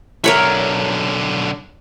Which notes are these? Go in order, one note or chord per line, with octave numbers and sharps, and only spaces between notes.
B1 D3 A#4 C#5 E5